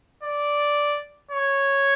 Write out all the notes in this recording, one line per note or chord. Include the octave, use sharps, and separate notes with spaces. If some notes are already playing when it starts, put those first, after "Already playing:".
D5
C#5